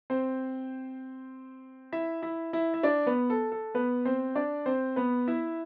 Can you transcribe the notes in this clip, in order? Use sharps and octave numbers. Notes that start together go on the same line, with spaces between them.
C4 C5
E4 E5
E4 E5
E4 E5
E5
D4 D5
B3 B4
A4
A4
B3 B4
C4 C5
D4 D5
C4 C5
B3 B4
E4 E5